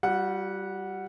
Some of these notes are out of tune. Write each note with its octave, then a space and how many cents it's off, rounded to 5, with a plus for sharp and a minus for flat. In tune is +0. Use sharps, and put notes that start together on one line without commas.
G3 -15 F4 +35 F#5 -5